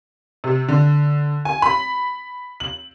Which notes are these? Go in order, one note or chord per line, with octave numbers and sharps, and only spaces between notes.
C3
D3
G#5
B5
F#7